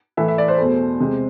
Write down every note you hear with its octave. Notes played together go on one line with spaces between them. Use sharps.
A2 E3 A3 E5
E5
D5
C5
E2 B2 A3
E2 C3 G#3